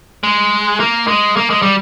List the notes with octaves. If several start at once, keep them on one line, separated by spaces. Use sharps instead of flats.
G#3
A#3
G#3
A#3
G#3
G3